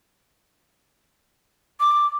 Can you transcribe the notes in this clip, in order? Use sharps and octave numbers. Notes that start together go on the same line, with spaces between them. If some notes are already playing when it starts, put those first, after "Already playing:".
D6